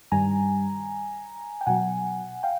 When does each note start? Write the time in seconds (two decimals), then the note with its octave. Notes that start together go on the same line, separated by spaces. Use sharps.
0.12 G2 D#3 G3 G#5 A#5
1.61 G5
1.66 B2 F#3 F#5 G#5
2.43 F5 G5